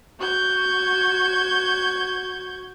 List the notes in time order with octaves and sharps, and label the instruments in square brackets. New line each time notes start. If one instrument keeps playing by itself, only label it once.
[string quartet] F#4 G6 G#6